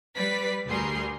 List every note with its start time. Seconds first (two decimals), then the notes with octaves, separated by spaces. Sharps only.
0.16 G3 B4 D5 B6
0.66 D2 G3 F#4 G#4 A#4 C6